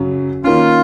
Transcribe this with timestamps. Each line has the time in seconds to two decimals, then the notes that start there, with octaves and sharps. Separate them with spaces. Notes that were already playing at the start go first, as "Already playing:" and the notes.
Already playing: F#2 C#3 F#3
0.44 D#3 A#3 C#4 F4